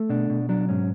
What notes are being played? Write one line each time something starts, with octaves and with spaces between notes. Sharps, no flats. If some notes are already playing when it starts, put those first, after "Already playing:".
Already playing: A3
B2 D4
B2
F#3 D4
G#2 C#4